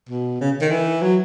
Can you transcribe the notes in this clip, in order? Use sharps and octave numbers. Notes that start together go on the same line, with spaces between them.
B2
C#3
D#3
E3
F#3